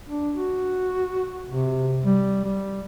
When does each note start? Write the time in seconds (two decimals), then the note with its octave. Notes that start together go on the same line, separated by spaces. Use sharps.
0.10 D4
0.35 F#4
1.49 C3
2.05 G3
2.44 G3